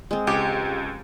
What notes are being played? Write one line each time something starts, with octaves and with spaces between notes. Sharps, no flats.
G#3 C4
C#2 G4